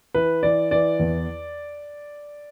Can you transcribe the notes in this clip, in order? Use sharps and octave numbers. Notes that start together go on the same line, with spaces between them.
E3 B4
E3 D5
E3 D5
E2